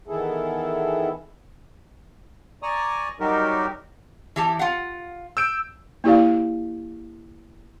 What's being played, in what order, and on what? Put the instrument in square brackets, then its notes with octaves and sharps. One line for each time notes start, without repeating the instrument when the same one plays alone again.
[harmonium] D#3 E3 B3 E4 G#4 A4
[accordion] D5 G#5 A#5 C#6 D#6
F#3 G3 D#4 F#4 G4 A#4
[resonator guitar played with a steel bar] E3 G4 A5
F4 F5 F#5
[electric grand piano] E6 G6 D7
[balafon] A#3 E4 G4 D5 F5